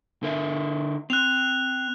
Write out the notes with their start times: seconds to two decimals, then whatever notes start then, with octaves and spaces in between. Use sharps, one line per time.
0.23 D3 A#4 E5
1.10 C4 F#6 F7